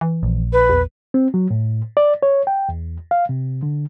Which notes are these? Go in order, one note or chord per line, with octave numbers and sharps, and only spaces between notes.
E3
A#1
B4
E2
C4
F#3
A2
D5
C#5
G5
E2
F5
C3
D3